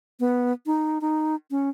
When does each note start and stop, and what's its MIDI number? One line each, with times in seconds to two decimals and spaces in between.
0.20 0.52 59
0.66 1.01 63
1.01 1.35 63
1.51 1.69 61